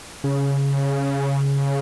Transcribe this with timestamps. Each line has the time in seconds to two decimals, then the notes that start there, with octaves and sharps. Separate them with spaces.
0.24 C#3